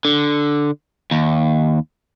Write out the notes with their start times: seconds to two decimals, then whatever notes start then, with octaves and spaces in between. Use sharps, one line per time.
0.05 D3
1.11 D#2